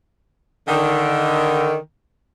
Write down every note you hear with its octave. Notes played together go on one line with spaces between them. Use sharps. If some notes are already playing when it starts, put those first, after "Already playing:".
D3 D#3